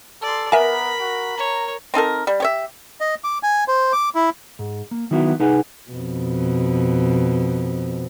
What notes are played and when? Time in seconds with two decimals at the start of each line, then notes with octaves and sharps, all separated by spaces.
0.22 A4 D5 C6
0.52 B3 A#4 E5 G#5 B5
1.00 F#4
1.37 C#5 A#5
1.94 C4 D#4 A4 A#4
2.27 G3
2.40 G4 C#5 E5
3.01 D#5
3.24 D6
3.43 G#5
3.68 C5
3.93 D6
4.15 E4
4.59 G#2
4.91 A#3
5.11 D#3 F#3 B3 E4 F#4
5.40 C2 D#4 G#4 B4 F#5 G#5
5.91 F2 B2